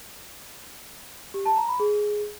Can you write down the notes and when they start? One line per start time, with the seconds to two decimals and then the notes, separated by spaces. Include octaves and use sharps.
1.34 G4
1.46 A5
1.57 A#5
1.68 B5
1.80 G#4